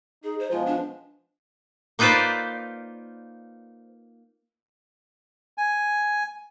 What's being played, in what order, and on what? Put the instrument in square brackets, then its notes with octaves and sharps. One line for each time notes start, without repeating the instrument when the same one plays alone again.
[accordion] D#4 [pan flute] G#4
[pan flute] C5
[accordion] B2 F3 G#3 [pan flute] F4
[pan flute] D4
[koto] A#3 D#4 F4 B4 C5 D5
[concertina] G#5